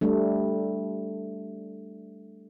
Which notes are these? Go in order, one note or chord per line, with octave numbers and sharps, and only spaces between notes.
G3 A3 D4